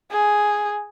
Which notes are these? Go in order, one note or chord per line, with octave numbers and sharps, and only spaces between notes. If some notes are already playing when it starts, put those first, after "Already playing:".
G#4